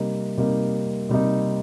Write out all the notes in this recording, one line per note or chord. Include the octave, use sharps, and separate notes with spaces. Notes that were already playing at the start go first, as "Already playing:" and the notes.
Already playing: C3 G3 A#3 D#4
C3 G3 A#3 D#4
C3 G3 A#3 D#4